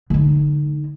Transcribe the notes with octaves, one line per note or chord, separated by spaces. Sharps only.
D3 D#4